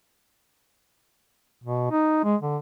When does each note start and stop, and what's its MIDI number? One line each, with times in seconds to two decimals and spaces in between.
1.64 1.88 47
1.91 2.22 63
2.24 2.36 56
2.41 2.57 50